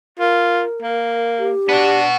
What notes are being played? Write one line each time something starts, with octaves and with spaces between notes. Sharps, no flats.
F4 A#4
A#3
G4
B3 D4 F#4